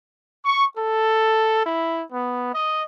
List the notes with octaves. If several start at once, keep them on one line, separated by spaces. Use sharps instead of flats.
C#6
A4
E4
B3
D#5